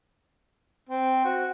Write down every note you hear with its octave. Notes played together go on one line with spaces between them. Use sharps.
C4
F#4